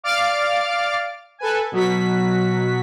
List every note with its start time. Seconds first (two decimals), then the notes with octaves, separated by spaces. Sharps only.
0.03 D5 F5 D6 F6 A6 D7
1.38 A4 B4 G#5
1.72 B2 F#3 F#4 B6